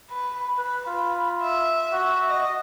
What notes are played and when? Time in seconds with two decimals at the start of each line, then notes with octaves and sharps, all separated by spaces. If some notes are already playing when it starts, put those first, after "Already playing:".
0.10 B4
0.58 B4 B5
0.87 F4
1.42 E5
1.92 F#4
2.29 D#5